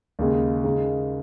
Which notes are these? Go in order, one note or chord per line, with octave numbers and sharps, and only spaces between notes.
D#2 C#3 G#3
C#3 G#3 D#4